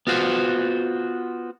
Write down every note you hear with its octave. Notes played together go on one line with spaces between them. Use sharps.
B3 F4 F#4 C5